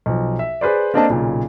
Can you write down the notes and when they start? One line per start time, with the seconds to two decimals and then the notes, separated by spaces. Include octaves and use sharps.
0.06 B1 F3
0.39 E5
0.61 G#4 B4 C5 D5
0.94 A#3 C4 D4 A4 D#5 A5
1.09 B1 A#2 C#3